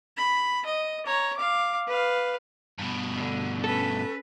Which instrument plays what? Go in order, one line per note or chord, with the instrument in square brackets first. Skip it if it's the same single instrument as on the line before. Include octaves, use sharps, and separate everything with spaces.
[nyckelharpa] B5
D#5
C#5 A#5
F5 D6
B4 F5
[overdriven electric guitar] G2 B2
[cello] D3
[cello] C#4 B4 [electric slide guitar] A4